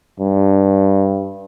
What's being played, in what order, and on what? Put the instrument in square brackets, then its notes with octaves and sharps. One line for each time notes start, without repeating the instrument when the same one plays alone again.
[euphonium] G2